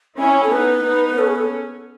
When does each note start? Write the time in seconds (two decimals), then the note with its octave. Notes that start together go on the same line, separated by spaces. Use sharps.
0.18 C#4 E4 G#5
0.43 A4
0.52 B3 D#4 B4
0.84 B3 D#4
1.18 C#4 A4
1.27 G#4
1.35 A4